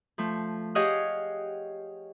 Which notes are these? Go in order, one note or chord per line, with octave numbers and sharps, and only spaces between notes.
F3 A3
G4 G#4 C#5 D#5 F5 F#5